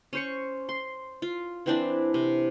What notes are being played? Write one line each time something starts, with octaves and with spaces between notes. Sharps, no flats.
C#4 C5 C#6
C6
F4
E3 C4 D4 E4
C3